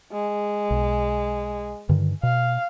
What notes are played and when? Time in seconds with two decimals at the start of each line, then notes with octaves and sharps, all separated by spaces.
0.12 G#3
0.71 B1
1.89 G2 D3 D#3
2.23 B2 F5